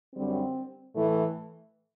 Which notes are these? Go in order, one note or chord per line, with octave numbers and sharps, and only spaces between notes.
F#2 D3 G3 C4
A2 E3 A3